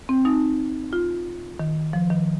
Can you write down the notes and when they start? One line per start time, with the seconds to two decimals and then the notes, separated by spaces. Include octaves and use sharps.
0.09 C4
0.25 D#4
0.93 F4
1.59 D#3
1.93 F3
2.10 D#3